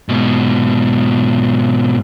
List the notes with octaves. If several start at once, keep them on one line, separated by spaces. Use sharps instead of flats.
G#2 B2